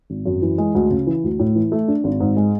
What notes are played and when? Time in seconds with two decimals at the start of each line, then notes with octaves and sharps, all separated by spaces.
0.10 G#1
0.26 F#2
0.42 E3
0.58 G#3
0.75 D2
0.91 C#3
1.07 E3
1.24 D2
1.39 A2
1.55 E3
1.72 A3
1.88 D4
2.04 G#1
2.20 G#2
2.37 G#3